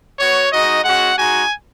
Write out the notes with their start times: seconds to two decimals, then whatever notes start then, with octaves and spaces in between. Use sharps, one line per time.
0.20 B3 F#4 C#5
0.52 G#3 D#4 F#4 D#5
0.85 G#3 C#4 F#4 F#5
1.17 G#3 D#4 F#4 G#5